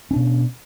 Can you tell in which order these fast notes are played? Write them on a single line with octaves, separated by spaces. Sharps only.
C#4 D4 B2